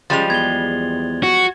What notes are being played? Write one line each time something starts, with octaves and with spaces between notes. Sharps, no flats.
C#3 F3 G3 G#3 A6 F7
E2 G#6 G7
F#4